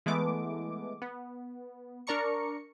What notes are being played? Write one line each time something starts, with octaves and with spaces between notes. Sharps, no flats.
E3 G#3 A3 B3 D6
B3
D4 A#4 D5 A#5 C#6 C#7